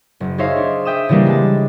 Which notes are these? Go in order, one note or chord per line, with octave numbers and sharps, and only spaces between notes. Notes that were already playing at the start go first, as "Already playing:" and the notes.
F#1
D#4 G#4 C5 C#5 E5 F5
D4
E5 G5 D#6 E7
C#3 E3 G3 A#3 D4
G#3 A5